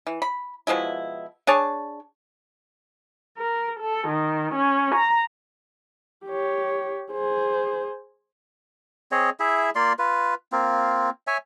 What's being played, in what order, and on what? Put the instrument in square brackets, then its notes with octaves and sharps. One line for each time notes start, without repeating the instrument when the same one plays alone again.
[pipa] E3
B5
B2 F3 G#3 E4
D4 G#4 C#5 A5
[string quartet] A#4
A4
D#3
C#4
A#5
[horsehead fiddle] G4 C#5
G#4 C5
[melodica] C4 G#4 C#5 D#5
E4 G#4 E5
A#3 F4 D5 C6
F4 B4
A#3 C4 F4
C#5 E5 G#5